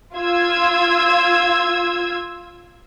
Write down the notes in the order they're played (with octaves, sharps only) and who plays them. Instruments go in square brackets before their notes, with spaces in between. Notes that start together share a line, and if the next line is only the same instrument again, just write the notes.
[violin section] F4 E6 G#6